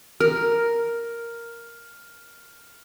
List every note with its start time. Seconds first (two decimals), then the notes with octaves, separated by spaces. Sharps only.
0.20 A#4 F6